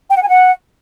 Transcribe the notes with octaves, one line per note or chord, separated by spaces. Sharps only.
G5
F#5
G#5
F#5